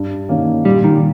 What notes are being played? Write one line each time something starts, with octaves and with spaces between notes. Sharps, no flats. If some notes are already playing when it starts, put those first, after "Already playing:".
Already playing: G2
D#3 A#3 C#4
A#2 G3
D#3